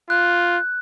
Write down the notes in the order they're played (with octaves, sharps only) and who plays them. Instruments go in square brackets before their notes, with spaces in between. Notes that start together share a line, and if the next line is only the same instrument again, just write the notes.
[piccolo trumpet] F4 [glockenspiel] F#6